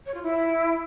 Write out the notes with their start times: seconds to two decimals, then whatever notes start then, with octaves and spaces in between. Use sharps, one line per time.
0.06 C#5
0.14 F4
0.23 E4